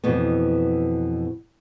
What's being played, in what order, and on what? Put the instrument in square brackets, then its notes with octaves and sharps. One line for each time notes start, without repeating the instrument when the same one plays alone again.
[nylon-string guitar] F2 B2 E3 B3